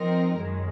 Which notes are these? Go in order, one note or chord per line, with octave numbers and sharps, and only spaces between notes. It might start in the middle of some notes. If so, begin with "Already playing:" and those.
Already playing: F3 C4 D#4 A#4
F#2 D#3 G#3